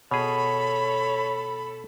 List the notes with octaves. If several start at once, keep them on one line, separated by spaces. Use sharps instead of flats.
B2 G#4 A4 C#5 B5